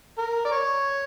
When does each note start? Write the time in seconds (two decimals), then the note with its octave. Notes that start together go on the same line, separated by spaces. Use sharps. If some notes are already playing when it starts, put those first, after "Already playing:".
0.18 A#4
0.45 D5
0.52 C#5